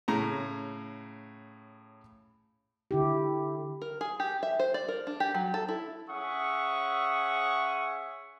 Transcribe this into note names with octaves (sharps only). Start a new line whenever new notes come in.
A2 C#3 A#5
D3 E4 G4
A#4
G#4
G4
E5
C5
D5
A#4
D4
G4
F#3
A4
E4
C#4 G#4 E5 F#5 C#6 D#6